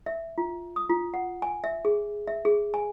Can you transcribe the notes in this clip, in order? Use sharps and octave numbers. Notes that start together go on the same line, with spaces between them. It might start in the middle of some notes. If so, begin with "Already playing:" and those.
E5
F4
D#6
F4
F#5
G#5
E5
G#4
E5
G#4
G#5